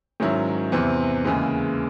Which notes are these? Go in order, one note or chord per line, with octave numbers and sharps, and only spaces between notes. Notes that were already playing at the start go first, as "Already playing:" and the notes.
G#2 D#3 F#3 C#4 E4
E2 C3 E3 C4
D#2 C#3 E3 G#3